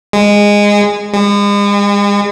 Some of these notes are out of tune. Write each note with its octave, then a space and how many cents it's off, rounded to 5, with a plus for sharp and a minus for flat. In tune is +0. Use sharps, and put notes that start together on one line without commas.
G#3 -15
G#3 -40